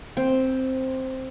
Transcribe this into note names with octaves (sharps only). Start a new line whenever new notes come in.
C4